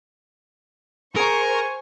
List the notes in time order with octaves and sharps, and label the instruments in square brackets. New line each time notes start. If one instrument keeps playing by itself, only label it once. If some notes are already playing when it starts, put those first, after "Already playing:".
[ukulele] G#4 A#5 [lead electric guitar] A#4 [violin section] C5 C#6 [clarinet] G#5